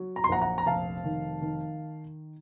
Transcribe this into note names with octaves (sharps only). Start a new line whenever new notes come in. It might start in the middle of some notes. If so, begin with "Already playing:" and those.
Already playing: F#3
A#5
C6
A#1 F#5 A#5
F#5 A#5
A#5
F1 F5 A5
D#3
D#3